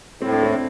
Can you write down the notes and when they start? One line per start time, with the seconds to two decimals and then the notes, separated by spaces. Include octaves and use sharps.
0.22 A2 C4
0.32 D4
0.43 C4